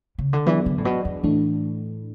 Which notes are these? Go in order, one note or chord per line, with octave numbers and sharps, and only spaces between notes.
C#3
D3
E3 F#3 B3 D4 G#4 D5
D3
A2
B2
E2
A2 E3 A3 D4